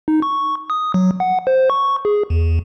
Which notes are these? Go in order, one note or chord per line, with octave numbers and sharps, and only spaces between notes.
D#4
C#6
D#6
F#3
F#5
C5
C#6
G#4
E2